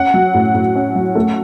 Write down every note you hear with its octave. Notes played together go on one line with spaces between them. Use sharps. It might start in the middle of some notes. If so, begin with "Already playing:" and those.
Already playing: C#4 F#5
F#3
A2
A2
C#4
F#3
A3